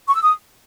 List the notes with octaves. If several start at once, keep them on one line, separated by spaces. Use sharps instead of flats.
C#6
E6
D#6